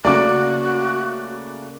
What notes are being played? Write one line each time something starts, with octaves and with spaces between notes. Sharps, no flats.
C#3 A3 A#3 F#4 D5 D6